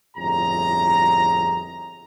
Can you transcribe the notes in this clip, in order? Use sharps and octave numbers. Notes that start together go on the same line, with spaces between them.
G1 F2 A2 G#4 A#5